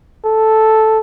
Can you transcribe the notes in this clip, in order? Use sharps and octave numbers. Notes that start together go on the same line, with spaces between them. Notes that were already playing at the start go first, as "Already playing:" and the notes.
A4